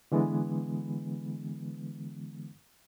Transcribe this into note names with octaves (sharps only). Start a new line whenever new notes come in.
D3 E3 G#3 B3